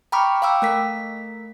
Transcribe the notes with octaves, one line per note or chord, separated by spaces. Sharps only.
G5 A#5 B5 C#6 D6 F6
F5 G5 D6 E6
A3 A#4 B6